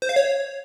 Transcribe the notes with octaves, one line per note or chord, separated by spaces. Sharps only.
C5
F5
C#5